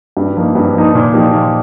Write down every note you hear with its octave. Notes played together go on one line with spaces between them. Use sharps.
G2
F3 A#3 D#4
G2
F3 A#3 D#4
A#2
F3 A#3 D#4 G4
A#2